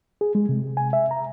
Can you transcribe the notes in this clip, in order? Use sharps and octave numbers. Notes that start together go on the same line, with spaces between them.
G#4
G#3
C3
G#5
E5
A#5